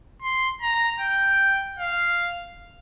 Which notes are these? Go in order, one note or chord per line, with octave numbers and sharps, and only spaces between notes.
C6
A#5
G5
F5